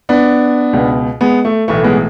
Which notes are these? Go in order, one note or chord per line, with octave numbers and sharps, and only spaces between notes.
B3 D4
C#2 B2
G#3 B3
A3
B1 A2 E3 A3
G#3 B3